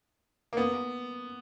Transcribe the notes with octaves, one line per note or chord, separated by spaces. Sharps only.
A#3
B3